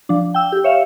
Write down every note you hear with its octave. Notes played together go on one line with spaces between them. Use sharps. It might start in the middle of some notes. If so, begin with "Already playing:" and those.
F3 D4
G5 E6
G4
C#5 E5 F5